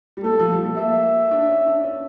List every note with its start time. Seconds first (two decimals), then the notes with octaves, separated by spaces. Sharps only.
0.17 G3
0.24 A3 A4
0.39 F3
0.52 G3
0.65 A3
0.77 A#3 E5
1.31 D4
1.48 C#4
1.66 D4
1.84 C#4